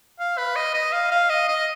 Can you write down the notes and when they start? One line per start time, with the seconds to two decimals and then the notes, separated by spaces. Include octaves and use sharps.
0.20 F5
0.38 B4
0.56 D#5
0.74 D#5
0.93 F5
1.11 F5
1.30 D#5
1.48 D#5